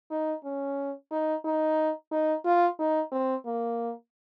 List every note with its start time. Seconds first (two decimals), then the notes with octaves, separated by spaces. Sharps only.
0.11 D#4
0.44 C#4
1.11 D#4
1.45 D#4
2.12 D#4
2.45 F4
2.79 D#4
3.12 C4
3.46 A#3